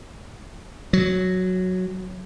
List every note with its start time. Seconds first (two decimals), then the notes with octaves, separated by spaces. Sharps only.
0.93 F#3